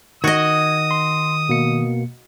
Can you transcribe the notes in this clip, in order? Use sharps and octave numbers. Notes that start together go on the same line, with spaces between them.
D#3 F#4 D#5 D#6 G#6
C6
B2 A#3 C#7